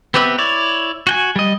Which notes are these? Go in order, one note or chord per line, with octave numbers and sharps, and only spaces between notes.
B3 C4 G4 B4 E5
E4 C#5 D5
F#4 G5 G#5
G3 D#5